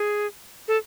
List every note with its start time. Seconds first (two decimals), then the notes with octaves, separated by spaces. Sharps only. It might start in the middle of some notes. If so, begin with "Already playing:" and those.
Already playing: G#4
0.68 A4